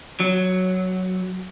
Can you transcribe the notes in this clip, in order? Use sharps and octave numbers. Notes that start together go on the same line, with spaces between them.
F#3